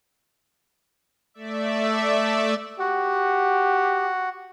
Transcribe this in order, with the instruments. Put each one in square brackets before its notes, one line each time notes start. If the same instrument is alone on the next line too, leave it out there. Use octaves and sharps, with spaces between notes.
[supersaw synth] A3 D5 E5
[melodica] F#4 F#5 [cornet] G4